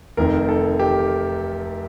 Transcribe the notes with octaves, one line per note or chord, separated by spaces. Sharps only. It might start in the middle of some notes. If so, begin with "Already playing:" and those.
F1 F2 D#3 A#4
A4
G4